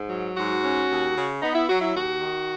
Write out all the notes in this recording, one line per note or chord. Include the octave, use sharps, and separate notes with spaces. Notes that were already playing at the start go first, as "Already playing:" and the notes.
Already playing: G#2
F#3
G#2 F#4
C#4
D#2
C#3
B3 D#4
E4
F#3 F#4
E4
D#2 F#4
D#3